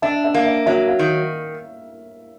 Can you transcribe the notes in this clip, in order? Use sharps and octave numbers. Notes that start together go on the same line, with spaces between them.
D4 E5
E5
A#3
E5
F#3 E5
F5
D#3